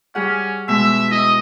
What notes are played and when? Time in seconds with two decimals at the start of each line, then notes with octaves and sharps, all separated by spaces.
0.15 G3 C#4 G#4 F#5
0.68 B2 G#3 E5
1.11 E4 D#5